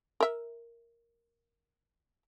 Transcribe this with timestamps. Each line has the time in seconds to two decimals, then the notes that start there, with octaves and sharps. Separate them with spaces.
0.20 A#4 E5